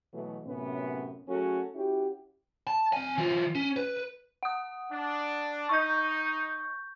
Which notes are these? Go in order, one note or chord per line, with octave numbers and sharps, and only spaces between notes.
B2 E3 F#3 A3
F#2 A2 C3 B3 C#4
F#3 A3 C#4 F#4 G#4 A4
C#4 E4 F#4 G4
A5
C4 G#5
E3 F4
C#4
B4
F#5 D#6
D4
D#4 C#6 G6